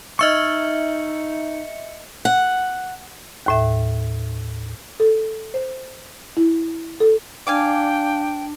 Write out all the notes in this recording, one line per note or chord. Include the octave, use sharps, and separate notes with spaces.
D#4 D#5 E5 C#6 E6 F6 C#7
F#5
D#2 A2 E5
A4
C5
E4
A4
D4 D5 F5 G5 G#5